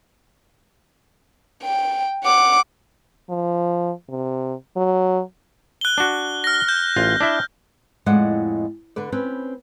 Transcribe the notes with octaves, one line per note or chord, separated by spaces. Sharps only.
G5
F#5 D6
F3
C3
F#3
F#6 G7
D4 F#4
F6 A#6
G6
A1 F4
D4 E4 E5
F2 A2 G#3 D5 D#5 F#5
D3 D4 B4 D5
C4 C#4 B4